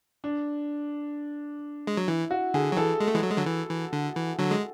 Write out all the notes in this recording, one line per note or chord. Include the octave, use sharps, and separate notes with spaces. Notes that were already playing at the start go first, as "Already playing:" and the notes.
D4
G#3
F#3
E3 E4
F#4
D3 G#4
F#3
E3 A4
G#3
A3
E3 G#3
F#3
G#3
D3 F#3
E3
E3
D3
E3
D3 F#3
G#3